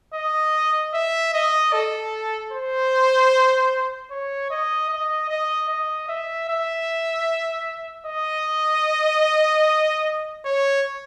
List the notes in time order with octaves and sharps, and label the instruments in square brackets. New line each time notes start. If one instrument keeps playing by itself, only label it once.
[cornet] D#5
E5
D#5
A4
C5
C#5
D#5
D#5
D#5
D#5
E5
E5
D#5
C#5